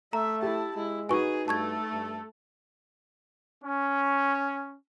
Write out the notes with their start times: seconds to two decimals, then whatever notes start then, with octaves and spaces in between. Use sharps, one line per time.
0.13 A3 E5 A#5
0.42 E4 G4 A5
0.76 G#3 E4
1.09 D#4 F#4 G#4 B4 G#5 C#6
1.48 G2 A3 A4 A5 C#6 G#6
1.93 G2
3.62 C#4